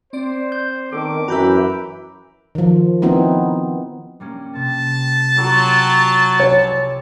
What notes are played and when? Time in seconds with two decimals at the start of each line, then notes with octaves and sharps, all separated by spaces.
0.13 C4 C5 D5
0.52 G6
0.93 D#3 B3 A4 D6
1.28 F#2 E3 F#4 A#5 B5 E6 G6 B6
2.55 D#3 F3
3.02 B3 C4 D#4 E4
4.20 G3 A#3 C#4
4.55 C3 A5
5.37 F#3 F4 G4 A4
6.40 C2 C#5